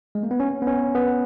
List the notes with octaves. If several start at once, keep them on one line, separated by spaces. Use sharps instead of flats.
G#3
A#3
B3
C#4
B3
C#4
B3